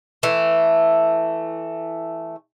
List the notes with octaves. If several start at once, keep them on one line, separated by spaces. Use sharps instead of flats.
E3 A3